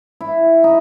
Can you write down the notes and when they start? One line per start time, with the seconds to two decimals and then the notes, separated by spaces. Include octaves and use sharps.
0.21 E4
0.64 D#4